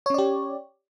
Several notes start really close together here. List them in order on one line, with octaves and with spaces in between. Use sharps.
C#5 C#4 D5 G4